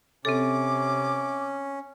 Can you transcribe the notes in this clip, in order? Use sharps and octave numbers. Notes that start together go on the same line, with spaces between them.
C3 C4 C#4 A4 D6